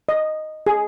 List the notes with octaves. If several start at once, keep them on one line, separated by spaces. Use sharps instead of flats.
D#5
G#4